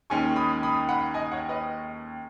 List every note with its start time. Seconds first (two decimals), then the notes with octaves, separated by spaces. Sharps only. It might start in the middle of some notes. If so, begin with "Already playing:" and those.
0.10 D#2 D#3 G#3 C#4 G#5 C#6
0.36 B5 D#6
0.63 B5 D#6
0.89 F#5 B5
1.14 D#5 G#5
1.32 C#5 F#5
1.49 B4 D#5